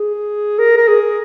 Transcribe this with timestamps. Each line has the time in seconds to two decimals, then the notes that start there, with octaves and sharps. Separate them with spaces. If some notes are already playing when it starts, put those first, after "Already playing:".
Already playing: G#4
0.59 A#4
0.77 A#4
0.88 G#4